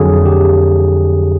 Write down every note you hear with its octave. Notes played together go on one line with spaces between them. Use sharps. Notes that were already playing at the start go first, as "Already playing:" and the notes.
Already playing: F2 D3 F#3 G#4
G4